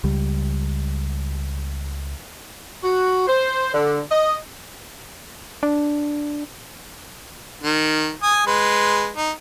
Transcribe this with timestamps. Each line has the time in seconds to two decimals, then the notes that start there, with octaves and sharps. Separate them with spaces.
0.04 C#2 G3
2.82 F#4
3.26 C5
3.72 D3
4.10 D#5
5.63 D4
7.63 D#3
8.23 G#5 D#6
8.47 G#3 B4 C6
9.17 D#4